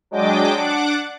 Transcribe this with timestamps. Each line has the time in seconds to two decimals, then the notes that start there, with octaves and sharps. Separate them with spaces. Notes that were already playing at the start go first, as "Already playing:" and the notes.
0.11 F#3 G#3 D4 D#5 G5 D6
0.56 D4 F#5 D6